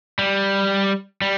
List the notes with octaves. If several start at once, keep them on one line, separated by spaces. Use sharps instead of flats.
G3
G3